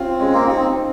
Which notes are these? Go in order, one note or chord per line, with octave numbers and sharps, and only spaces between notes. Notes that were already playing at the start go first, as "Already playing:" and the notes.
Already playing: C4 C#4 F4
G#3 C#4
A#3
C4 D#4
C4